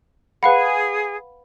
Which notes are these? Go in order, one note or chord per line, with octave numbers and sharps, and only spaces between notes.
G#4 B4 F5 F#5 B5